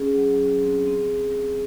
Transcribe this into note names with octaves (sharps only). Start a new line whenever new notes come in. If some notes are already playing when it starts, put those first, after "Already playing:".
Already playing: C#4 G#4
F#3
F#3
C4
C4